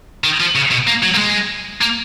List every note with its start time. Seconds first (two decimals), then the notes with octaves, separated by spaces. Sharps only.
0.24 D#3
0.40 F3
0.55 C#3
0.71 B2
0.87 A#3
1.03 F#3
1.14 A#3
1.18 G#3
1.81 A#3